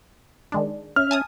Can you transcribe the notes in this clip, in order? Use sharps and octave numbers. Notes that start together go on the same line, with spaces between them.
D#3 G#3 D4
C#4 E5 F6
G#5 A5 D#6